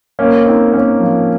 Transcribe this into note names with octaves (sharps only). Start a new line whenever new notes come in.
A#3 C#4
C4 D#4
A#3 C#4
F3